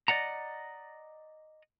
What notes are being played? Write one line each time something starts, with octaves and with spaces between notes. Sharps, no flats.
D5 D#5 F#5 A#5